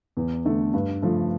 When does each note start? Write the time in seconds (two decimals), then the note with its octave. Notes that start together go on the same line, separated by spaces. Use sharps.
0.17 E2
0.45 D3 A3
0.74 G2
1.02 F3 A3